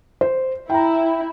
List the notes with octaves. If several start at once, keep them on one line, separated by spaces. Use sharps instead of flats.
C5
E4 G5 A#5